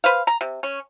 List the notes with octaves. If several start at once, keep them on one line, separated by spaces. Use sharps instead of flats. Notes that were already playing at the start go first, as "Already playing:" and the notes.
B4 C5 F5
A#5
C3
C#4